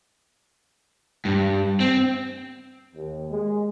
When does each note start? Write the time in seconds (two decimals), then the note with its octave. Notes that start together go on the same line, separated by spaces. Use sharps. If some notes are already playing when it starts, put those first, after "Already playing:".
1.25 G2
1.80 C4
2.95 D#2
3.31 G#3